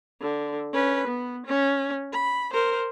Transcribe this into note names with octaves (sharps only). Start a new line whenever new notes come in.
D3
C#4 B4
B3
C#4
B5
A#4 C5